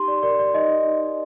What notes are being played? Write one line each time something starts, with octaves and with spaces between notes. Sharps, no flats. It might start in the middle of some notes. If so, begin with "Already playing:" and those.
Already playing: D#4 G4 C6
D5
A#4 D5
D5
D#4 D#5
D#4